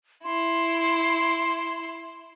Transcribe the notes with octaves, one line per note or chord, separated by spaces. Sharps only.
E4 C6